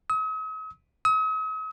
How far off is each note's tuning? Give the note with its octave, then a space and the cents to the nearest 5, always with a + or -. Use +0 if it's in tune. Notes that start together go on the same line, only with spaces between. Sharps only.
D#6 +45
D#6 +45